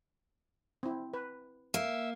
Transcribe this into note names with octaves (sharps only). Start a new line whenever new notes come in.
C4 E4
B4
A#3 E5